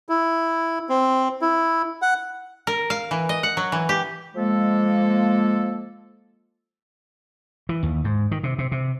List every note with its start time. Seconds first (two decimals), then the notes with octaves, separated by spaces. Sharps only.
0.09 E4
0.89 C4
1.42 E4
2.02 F#5
2.67 A#4
2.90 F5
3.11 E3
3.29 D#5
3.43 F#5
3.57 F#3
3.72 E3
3.89 G4
4.35 F3 G#3 A#3 A4
7.69 E3
7.83 D#2
8.04 G#2
8.31 D#3
8.43 C3
8.58 C3
8.72 C3